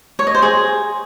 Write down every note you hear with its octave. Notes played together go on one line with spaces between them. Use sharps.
C#5
D#5
C5
G#4